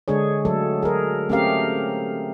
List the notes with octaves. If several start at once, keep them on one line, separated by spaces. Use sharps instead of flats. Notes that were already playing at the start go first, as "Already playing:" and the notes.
D3 G#3 D4 G#4 C#5
F#3 A3 A4
G#4 A#4
A3 C4 C#4 G4 A#4 F5